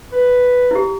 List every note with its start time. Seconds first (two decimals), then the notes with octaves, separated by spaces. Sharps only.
0.12 B4
0.71 E4 G4